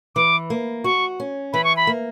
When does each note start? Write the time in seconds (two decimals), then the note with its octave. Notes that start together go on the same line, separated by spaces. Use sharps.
0.16 E3 D6
0.50 A#3
0.84 F#4 C#6
1.20 C#4
1.53 E3 B5
1.64 C#6
1.77 B5
1.87 A#3